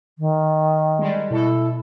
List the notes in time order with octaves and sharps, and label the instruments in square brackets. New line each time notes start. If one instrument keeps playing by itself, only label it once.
[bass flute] D#3
[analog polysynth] G3 G#3
[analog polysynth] B2 A4 [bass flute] E4